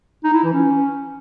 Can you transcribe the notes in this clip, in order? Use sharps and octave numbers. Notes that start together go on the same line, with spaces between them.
D#4
E4
E3
C#4